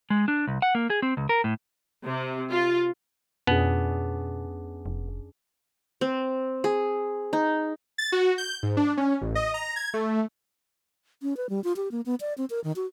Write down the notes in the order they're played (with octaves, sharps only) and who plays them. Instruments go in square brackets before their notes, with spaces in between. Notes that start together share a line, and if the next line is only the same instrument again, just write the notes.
[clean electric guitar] G#3
D4
C2
F#5
A#3
G#4
C4
C#2
A#4
A2
[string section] C3
F4
[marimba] F2 [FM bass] B2 [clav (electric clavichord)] B3 [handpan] C#4 D4 G#4
[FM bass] F1
[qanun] C4
G#4
D#4
[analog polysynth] A6
F#4
G6
G#2
D4
C#4
A1
D#5
A#5
G#6
A3
[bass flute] C#4
B4
G3
F4
G4
A#3
B3
D5
C4
A#4
D#3
F#4